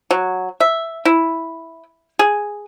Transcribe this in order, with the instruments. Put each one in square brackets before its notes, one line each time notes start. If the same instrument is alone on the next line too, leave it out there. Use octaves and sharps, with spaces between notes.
[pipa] F#3
E5
E4
G#4